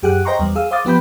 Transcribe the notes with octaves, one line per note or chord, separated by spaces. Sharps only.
F#2 G4 G#4 F#5 F#6
C5 D#5 G5 A#5 C6 C#6
E2 G3
G#4 F5 E6
C5 F5 D6 D#6 A6
F3 B3 G4 B5 G6